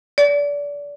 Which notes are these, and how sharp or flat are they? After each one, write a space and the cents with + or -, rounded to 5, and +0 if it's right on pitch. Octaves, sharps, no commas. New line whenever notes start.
D5 -25